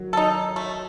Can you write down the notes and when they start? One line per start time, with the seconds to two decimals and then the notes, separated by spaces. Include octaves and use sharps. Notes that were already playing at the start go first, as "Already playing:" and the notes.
Already playing: D#3 F#3
0.13 D#4 A4
0.56 A3